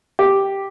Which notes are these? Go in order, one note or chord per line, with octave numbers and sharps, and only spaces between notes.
G4